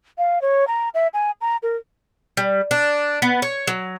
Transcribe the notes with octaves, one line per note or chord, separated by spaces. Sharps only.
F5
C#5
A#5
E5
G#5
A#5
A#4
G3
D4
B3
C#5
F#3